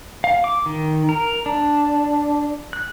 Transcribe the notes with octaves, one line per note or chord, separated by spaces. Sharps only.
F5
D6
D#3
A#4
D4
F#6